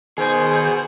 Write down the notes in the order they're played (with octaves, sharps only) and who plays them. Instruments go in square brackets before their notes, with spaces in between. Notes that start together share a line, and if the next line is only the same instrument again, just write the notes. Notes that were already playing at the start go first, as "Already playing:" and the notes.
[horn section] B2 [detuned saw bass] D#3 [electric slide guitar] G#4 [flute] C5